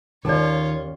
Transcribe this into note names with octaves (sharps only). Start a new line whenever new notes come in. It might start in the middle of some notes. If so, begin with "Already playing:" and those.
D#2 D#3 C#4 F4 A4 C#5 D5 A5